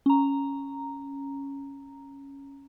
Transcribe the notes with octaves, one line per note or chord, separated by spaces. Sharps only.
C#4 A#5